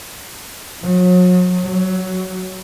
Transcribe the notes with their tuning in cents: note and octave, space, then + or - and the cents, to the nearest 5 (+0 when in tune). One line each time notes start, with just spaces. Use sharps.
F#3 -40
F#3 +15